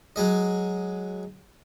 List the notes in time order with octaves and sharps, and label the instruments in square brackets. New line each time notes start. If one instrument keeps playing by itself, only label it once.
[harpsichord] F#3 G#3 D#5